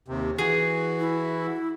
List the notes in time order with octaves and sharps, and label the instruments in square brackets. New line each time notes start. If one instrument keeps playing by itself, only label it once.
[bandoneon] D#2 C3
[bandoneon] E3 F#4 [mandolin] G#4
[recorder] E4